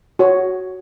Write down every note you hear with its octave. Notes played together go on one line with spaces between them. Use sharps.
F#4 C#5